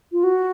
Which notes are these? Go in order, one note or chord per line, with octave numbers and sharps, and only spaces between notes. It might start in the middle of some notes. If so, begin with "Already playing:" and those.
F4
F#4